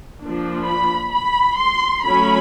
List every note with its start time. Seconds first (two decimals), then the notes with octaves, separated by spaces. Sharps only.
0.21 F3 A#3 D4
0.67 B5
1.13 B5
1.59 C6
2.05 F#3 A3 C#4 B5